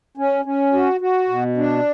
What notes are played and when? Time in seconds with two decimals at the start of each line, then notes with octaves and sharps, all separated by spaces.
0.17 C#4
0.45 C#4
0.73 F#4
1.01 F#4
1.29 B2
1.57 D4